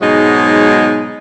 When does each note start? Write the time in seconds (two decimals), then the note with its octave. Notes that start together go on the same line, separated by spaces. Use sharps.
0.01 G#2 B2 F#3 G#3 D#4